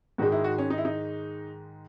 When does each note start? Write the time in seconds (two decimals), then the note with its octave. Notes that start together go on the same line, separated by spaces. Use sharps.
0.18 G#2 D#3 G#3 F#4
0.32 E4
0.44 F#4
0.58 C#4
0.70 D#4
0.78 E4
0.85 D#4